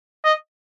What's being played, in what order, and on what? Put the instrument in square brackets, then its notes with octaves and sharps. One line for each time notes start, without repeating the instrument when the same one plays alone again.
[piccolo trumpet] D#5